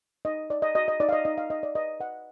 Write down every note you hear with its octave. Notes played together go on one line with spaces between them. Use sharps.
D#4 D#5
D#4 D5
D#5
F#4 D#5
D#5
D#4 D5
F5
D#5
D#4 D#5
F5
D#4 D#5
D5
B4 D#5
B4 F#5